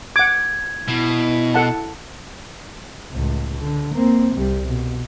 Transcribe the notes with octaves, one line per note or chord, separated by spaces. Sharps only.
F#5 D6 G#6
B2 E4
A4 F#5 A5
C#2 A2
D3
A#3 C4
C2 G3
B2